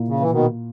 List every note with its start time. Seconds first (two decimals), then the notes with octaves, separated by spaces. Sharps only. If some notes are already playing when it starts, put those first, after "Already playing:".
Already playing: A#2 A#3 E4
0.08 C#3
0.20 E3
0.31 B2 D#3